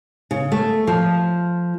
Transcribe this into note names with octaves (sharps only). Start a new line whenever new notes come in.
C#3
A3
F3